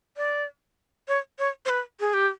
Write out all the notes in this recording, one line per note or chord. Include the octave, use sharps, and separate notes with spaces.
D5
C#5
C#5
C5
B4
G#4
G4